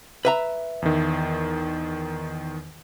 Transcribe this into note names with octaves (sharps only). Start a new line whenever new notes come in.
B4 E5 A#5
E2 D#3